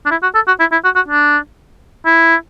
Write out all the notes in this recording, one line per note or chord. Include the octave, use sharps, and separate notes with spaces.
D4
E4
F#4
A4
F#4
E4
E4
F#4
F#4
D4
E4